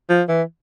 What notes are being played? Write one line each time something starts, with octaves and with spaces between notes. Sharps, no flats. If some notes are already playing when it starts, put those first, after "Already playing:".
F3
E3